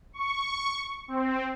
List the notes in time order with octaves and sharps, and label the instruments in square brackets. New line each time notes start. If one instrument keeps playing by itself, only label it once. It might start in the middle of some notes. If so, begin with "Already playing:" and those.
[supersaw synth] C#6
C4